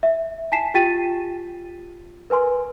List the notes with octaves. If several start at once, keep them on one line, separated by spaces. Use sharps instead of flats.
E5
G#5 A5 B6 C7 E7
F4 G4 G5 A6 B6 D#7
A#4 B4 G#5 C6